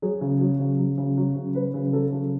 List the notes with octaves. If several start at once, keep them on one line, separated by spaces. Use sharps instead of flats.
F#3 G#4
C#3
F#3
C#3
F#3
C#3
F#3
C#3
F#3 B4
C#3
F#3 A4
C#3